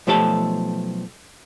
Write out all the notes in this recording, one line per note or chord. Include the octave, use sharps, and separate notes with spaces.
B1 F3 A3 G4 A4 A5